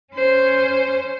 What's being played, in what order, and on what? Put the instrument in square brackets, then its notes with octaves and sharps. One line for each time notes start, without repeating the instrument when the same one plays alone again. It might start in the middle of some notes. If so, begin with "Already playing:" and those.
[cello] C#4 C5